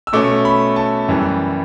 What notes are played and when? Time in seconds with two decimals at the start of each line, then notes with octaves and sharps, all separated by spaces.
0.07 E6
0.13 B2 A3 C#4 D6
0.45 B5
0.76 A5
1.08 F#2 E3 G3